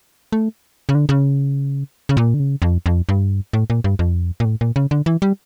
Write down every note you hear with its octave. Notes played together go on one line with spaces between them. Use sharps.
A3
C#3
D3
C#3
C#3
A#2
D3
C#3
F2
F2
G2
A2
A#2
G2
F2
A#2
A2
A#2
C#3
D3
E3
G3